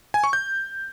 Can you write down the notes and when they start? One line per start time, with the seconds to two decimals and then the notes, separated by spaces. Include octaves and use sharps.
0.14 G#5
0.24 C#6
0.33 G6